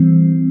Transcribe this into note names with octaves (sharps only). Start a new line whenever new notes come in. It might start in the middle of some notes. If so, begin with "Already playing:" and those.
Already playing: E3 G3 C4